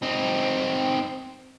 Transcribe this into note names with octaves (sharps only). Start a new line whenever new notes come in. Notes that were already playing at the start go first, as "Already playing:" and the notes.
C4 D#4